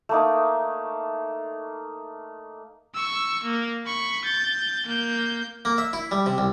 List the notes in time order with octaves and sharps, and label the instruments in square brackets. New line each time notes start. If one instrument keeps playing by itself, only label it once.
[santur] A3 A#3 D#4
[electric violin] C#6 E6
A#3
B5 C#6
G6 A6
A#3 G6
[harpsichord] A#3
E5
E4
G3
C3
C2